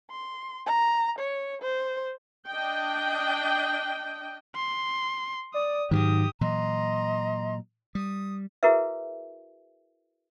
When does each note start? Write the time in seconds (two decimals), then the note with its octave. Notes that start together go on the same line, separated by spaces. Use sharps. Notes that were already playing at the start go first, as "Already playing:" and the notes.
0.11 C6
0.66 A#5
1.18 C#5
1.62 C5
2.48 D4 D#5 G5
4.56 C6
5.54 D5 D#6
5.91 G#2 D#3 E3 F#3 G4 D#6
6.41 A#2 E3 F#3 D#5 A#5 C6
7.95 G3 D#6
8.63 E4 F#4 G#4 A#4 B4 E5